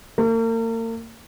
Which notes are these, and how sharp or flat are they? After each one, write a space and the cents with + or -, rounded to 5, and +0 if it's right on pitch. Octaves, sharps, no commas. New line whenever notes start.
A#3 -40